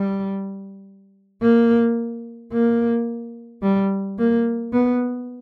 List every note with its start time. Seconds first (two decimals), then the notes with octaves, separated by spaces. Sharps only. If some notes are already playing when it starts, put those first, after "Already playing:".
Already playing: G3
1.42 A#3
2.53 A#3
3.62 G3
4.19 A#3
4.73 B3